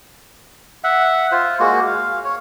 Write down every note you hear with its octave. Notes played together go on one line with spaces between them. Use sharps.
E5 F#5
F4 C5
G#3 A#3 F#4
F5
C#5